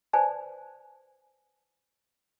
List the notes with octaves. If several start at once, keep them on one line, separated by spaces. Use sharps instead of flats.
B4 C5 D5 G#5 A5